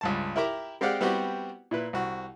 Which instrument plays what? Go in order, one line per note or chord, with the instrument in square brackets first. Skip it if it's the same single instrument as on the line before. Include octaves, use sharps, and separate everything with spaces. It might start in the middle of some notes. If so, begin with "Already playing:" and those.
[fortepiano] C#2 G2 A5
E4 G4 A#4 E5 A#5 D6
G#3 C4 G4 D5 F5 F#5
G3 B3 C4 E4 F#4 G4
A#2 E4 B4
C2 F#4